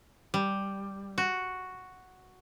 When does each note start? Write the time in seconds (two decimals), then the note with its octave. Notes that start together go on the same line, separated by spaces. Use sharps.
0.34 G3
1.18 F#4